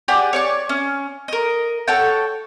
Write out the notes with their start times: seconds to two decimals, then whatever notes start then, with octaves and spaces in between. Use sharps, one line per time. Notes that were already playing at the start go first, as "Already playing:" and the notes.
0.08 G4 G#4 D5 F#5
0.33 C#5 D5 C#6
0.69 C#4
1.28 A#4 D#5
1.87 A4 C#5 F#5 G5